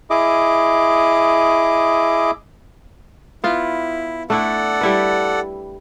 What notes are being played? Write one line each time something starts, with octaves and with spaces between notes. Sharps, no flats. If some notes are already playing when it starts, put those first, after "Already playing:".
E4 G#4 D#5 D6
B3 E4 F4
A3 D4 E4 A4 D5 F#5
G3 E4 B4